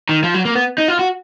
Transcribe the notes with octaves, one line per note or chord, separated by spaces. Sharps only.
D#3
F3
F#3
A#3
B3
D#4
F4
F#4